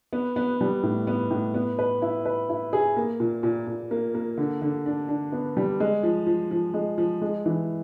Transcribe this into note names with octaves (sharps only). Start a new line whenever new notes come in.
B3
B3
G3
A2
B3
A2
B3
B4
E4
B4
E4
G#4
A#3
A#2
A#2
A#2
A#3
A#3
D3
D3
D4
D4
B3
G3
G#3
F3
F3
F3
G#3
F3
G#3
E3